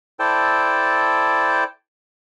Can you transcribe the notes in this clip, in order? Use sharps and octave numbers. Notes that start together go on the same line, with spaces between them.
E4 A4 C5 D5 G5 A5